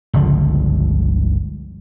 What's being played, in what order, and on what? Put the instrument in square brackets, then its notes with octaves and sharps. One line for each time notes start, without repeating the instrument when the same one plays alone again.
[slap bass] G1 C#2 D3 F3